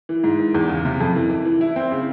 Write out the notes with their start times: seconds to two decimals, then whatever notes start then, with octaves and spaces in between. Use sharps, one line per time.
0.09 E3
0.24 G#2
0.39 E3
0.54 E2
0.69 C#3
0.85 C3
1.00 F2
1.15 E3
1.30 E3
1.45 E3
1.61 E4
1.76 C4
1.91 C#3